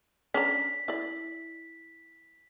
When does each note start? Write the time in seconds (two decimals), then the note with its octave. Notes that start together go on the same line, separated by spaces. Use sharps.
0.34 C#4 D4 A#5 B6
0.88 E4 D5